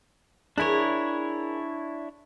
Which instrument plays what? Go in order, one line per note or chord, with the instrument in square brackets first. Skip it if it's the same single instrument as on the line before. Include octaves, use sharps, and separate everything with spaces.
[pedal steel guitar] D4 E4 C#5 [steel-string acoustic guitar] G#4 A#4